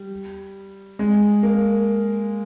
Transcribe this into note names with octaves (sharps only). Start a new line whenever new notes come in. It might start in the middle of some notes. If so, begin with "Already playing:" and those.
Already playing: G3
G#3
A#3